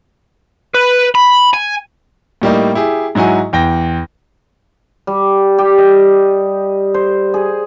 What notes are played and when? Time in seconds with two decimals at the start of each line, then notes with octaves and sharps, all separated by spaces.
0.74 B4
1.15 B5
1.54 G#5
2.42 A2 G3 A#3 D#4
2.75 E4 G4 G#4
3.15 G#2 F#3 E4 F#4 G#5
3.53 E2 G5 A#6
5.07 G3
5.58 G4
5.78 D#5
6.94 C5
7.34 G#4